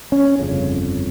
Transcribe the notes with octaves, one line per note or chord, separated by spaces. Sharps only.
C#4
G1 F2 C#3